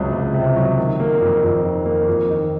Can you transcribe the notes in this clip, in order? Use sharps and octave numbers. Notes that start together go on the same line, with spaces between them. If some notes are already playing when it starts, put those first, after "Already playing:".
Already playing: C#2 C3 F#3
C#2
C3
F#3
D#3
A#3
F2
F2
D#3
A#3
F2
D#3